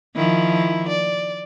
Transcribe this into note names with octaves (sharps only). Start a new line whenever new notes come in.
D#3 F3 E4
D5